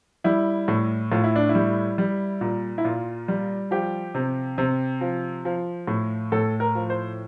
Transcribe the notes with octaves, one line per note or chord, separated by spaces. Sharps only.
G3 E4
A2
A2 F4
E4
D4
E4
G3
G3
A#2
E4
A#2 F4
G3
F3 G4
C3
C3
F3
F3
A2
A2 A4
A#4
F3
C5